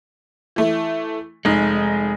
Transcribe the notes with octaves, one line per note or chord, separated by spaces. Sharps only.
E3 A3
F1 G#3 D#4